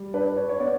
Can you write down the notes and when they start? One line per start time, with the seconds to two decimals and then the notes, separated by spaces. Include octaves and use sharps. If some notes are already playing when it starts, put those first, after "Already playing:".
Already playing: G3
0.14 D4 B4
0.36 C#5
0.49 C#5
0.60 B3 D5